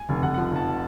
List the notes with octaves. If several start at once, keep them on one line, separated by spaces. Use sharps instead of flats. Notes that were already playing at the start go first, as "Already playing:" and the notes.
Already playing: G#5
F1
F1 F#5
F3 F#5
F1 A5